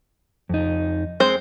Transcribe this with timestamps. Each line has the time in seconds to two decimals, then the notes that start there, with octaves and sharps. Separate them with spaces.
0.49 F2 D#4
1.20 G#3 C4 C5